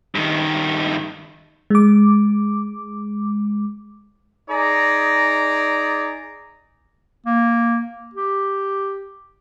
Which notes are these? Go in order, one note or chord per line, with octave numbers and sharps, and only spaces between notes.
G2 D#3
G#3 D6
D#4 G#4 D5 A#5
A#3
G4